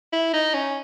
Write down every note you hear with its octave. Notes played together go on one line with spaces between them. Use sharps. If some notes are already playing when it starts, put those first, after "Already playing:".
E4
D#4
C#4